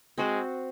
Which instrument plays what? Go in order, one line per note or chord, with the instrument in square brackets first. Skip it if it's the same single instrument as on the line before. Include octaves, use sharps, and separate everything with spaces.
[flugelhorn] G#3 [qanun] C4 F#4 C5